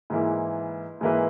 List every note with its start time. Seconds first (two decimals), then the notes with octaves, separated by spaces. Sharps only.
0.10 G#2 E3 A#3 E4 B4
1.01 G#2 E3 A#3 E4 B4